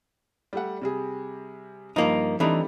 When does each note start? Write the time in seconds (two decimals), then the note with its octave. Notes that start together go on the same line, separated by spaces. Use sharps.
0.53 G3 A3 F#5
0.81 C3 G3 G#4
1.96 G2 F3 A#3 D#4
2.40 E3 G3 A3 C4 D4 D#4